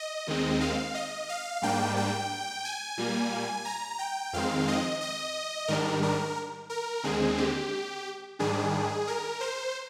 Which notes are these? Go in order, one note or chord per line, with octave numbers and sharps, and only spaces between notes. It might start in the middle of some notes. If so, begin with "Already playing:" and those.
Already playing: D#5
D#2 D#3 G#3 C4
F5
D#5
F5
G#2 G3 A#3 D4 G5
G5
G#5
A#2 G3 A#3
A#5
G5
F2 D#3 G#3 C4 F5
D#5
D#5
G#2 D#3 G3 D4 A#4
A#4
A#4
D#2 D3 G#3 C4 G#4
G4
G#2 D#3 G3 D4 G#4
A#4
C5